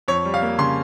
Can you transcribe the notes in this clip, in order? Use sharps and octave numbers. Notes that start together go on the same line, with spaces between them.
F2 C#5
G3
F5
A#3
C#3 C6